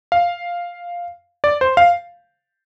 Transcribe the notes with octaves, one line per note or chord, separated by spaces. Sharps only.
F5
D5
C5
F5